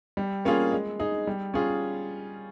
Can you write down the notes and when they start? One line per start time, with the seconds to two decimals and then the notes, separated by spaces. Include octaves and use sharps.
0.17 G3
0.45 A#3 C#4 F4 G#4
0.72 G#3
0.99 D#4 G#4
1.27 G3
1.54 C#4 F4 G#4